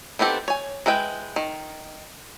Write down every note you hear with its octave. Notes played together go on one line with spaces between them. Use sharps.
D#3 B3 C4 G4 A4
C#5 G#5
G#3 E4 B4 G5
D#3